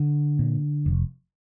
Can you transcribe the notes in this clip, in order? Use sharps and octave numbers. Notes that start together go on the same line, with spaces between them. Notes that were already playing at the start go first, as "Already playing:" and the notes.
Already playing: D3
A#2
F1